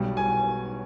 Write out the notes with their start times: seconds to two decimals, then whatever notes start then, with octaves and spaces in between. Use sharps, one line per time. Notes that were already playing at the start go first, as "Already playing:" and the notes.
Already playing: B1 B2 G3
0.17 G#5